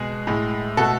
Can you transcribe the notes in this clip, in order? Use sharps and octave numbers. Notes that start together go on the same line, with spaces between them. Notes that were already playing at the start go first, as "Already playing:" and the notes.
Already playing: B2 G#3 G#4
A2 G#3
B2 A3 F#4 A4